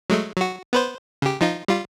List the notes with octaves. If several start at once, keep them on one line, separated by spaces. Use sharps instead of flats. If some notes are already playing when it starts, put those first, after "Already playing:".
F#3 G#3 A3
F#3 F#4
B3 B4 C5
C#3 G4
F3 D#4 F4
G3 F4